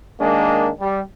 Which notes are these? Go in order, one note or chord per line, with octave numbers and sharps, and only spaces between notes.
D#3 G#3 A#3 D4
G3